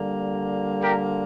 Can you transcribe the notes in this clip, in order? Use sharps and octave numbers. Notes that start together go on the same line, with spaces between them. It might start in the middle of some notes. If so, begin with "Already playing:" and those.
Already playing: D3 G3 A#3
G4 A#4